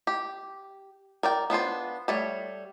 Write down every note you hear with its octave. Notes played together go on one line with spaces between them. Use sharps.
G4
A#4 D5 G5
B3 D4 F4 C5
G3 A3 C#5